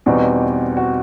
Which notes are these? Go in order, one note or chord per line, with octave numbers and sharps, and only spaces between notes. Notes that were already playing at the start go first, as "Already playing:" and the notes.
E2 B2 G3 C4 D#4 F#4
F#4